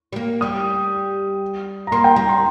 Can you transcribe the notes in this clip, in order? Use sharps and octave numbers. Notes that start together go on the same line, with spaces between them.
G3
A#3
G3 D#6
A#5
A#3 C6
G5
G3 A#5
C6